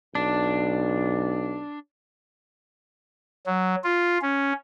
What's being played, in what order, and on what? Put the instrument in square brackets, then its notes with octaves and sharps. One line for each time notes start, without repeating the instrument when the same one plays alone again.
[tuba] B1 [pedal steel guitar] D4
[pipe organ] F#3
F4
C#4